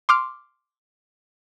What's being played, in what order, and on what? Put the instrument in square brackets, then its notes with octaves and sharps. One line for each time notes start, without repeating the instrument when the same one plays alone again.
[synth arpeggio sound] C6 D6 F6